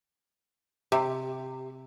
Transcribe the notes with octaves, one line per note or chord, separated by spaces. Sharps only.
C3 G4